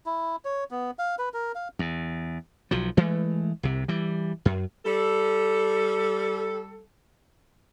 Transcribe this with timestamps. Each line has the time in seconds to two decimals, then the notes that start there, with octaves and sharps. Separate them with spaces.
0.06 E4
0.45 C#5
0.71 B3
0.99 F5
1.19 B4
1.34 A#4
1.55 F5
1.79 E2
2.71 B1 F3 F#3
2.97 E3 G#3 A3
3.63 C2 C3
3.88 E3 G3
4.45 F#2
4.85 G3 A4